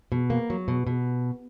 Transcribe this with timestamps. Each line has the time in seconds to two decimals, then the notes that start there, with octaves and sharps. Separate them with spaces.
0.12 B2
0.30 A#3
0.50 F#3
0.68 B2
0.87 B2